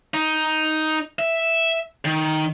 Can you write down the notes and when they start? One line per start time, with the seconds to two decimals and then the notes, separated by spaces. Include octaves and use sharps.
0.14 D#4
1.19 E5
2.05 D#3